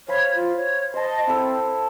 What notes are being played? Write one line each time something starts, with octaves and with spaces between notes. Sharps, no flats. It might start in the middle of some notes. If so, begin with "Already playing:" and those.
C5 C#5 F5 B5
F4
C#5
C5 D#5 A5
C4 E4 A4